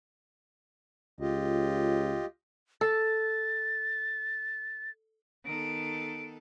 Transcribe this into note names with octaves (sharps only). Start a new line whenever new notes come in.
C#2 F4 G4 D#5
A4 A6
D#3 B3 A4 D7